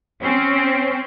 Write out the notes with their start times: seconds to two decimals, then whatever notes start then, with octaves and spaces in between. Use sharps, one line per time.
0.21 C4 C#4